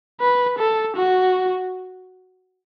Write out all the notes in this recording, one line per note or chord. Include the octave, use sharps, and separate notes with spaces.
B4
A4
F#4